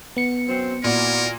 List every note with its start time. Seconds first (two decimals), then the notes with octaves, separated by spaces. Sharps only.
0.16 B3 C#7
0.48 F#2 F#3 C4
0.84 A#2 E4 F#4 A#4 D5